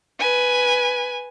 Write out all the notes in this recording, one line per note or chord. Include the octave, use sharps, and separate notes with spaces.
B4 G#5